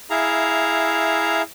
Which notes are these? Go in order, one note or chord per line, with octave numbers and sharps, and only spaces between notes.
E4 G#4 E5 F5 A#5